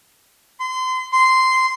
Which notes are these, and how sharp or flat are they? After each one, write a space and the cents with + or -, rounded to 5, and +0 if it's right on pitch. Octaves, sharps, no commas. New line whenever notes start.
C6 -30
C6 -10